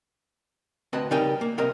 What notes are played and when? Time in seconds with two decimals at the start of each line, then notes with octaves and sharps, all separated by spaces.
0.93 D2 C4 B4 D#5 A5
1.11 C#3 G3 D#4 A#4 G5 G#5
1.41 A#3
1.58 C2 C3 C4 A#4 D#5